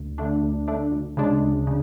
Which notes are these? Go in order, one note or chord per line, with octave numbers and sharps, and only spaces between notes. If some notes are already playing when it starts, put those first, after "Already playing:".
Already playing: D2
D3 A3 D4
D2
D3 A3 D4
D2
C#3 G#3 D4
D2
C#3